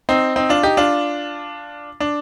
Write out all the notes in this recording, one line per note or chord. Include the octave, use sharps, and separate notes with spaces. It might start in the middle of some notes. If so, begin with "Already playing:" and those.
C4 D#4
C4 D#4
D4 F4
D#4 G4
D4 F4
D4